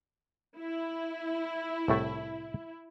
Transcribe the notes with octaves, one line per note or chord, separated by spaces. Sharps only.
E4
C2 A2 A3